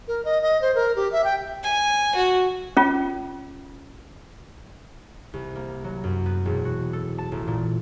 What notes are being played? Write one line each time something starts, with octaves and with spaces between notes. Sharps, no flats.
A#4
D#5
D#5
C5
A#4
G4
E5
G5
G#5
F#4
C#4 F4
C2
A#3
F#3
F#2
B3
E1
F#4
A4
A5
A1
A#2